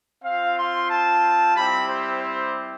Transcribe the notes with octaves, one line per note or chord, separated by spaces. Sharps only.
C4 F4 F5
C6
A5
G3 C4 E4 G4 B5
C5
C5